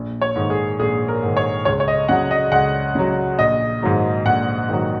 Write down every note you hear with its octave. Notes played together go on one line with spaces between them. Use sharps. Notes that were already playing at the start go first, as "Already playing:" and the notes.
Already playing: A#1
C#5
G#2 D#3
G#4
A#1 G#4
A#4
G#2 D#3
C#5
C#2 C#5
C#5
D#5
C#3 F#3 F#5
D#5
C#2 F#5
C#3 F#3
A#1 D#5
G#2 D#3 F#3
A#1 F#5
G#2 D#3 F#3